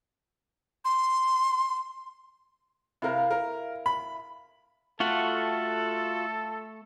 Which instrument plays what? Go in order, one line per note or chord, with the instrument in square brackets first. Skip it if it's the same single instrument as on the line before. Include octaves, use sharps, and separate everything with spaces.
[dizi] C6
[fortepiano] C3 A#4 [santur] E4 F5
[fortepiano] A#4
B5
[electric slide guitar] A3 [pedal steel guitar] F4 F#4 F#5 [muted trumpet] A4